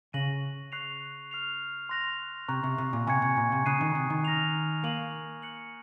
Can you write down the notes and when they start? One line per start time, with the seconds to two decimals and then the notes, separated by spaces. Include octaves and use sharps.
0.13 C#3 C#6 F#6 A#6 D#7 F#7
0.72 C#6 F#6 C7 F7
1.31 F6 C7 F7
1.89 C6 F#6 A#6 F7
2.48 C3 A#5 C#6 F#6
2.64 C3
2.78 C3
2.93 A#2
3.07 C3 G#5 C#6 G#6 C#7
3.22 C3
3.37 A#2
3.52 C3
3.66 C#3 A#5 D#6 F#6 C7 D#7
3.81 D#3
3.95 C3
4.10 D#3
4.25 F6 A#6 F7
4.84 A#3 C#6 G#6 D#7 F#7
5.42 F#6 C#7 F#7